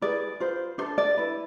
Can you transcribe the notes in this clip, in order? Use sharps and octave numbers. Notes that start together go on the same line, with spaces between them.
E4 G#4 B4 D5
F4 B4 C5
D4 A4 C5
D5
E4 B4